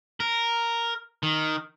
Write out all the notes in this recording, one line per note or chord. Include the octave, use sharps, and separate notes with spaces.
A#4
D#3